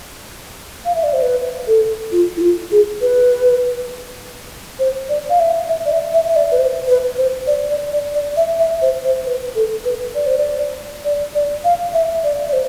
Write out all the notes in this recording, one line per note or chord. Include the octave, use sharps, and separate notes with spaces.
F5
E5
D5
C5
B4
A4
F4
E4
F4
G#4
B4
C5
D5
F5
E5
E5
D5
E5
E5
E5
D5
B4
C5
B4
C5
D5
D5
D5
D5
E5
E5
C5
C5
B4
A4
B4
D5
C5
D5
D5
D5
F5
E5
D5
D5
C5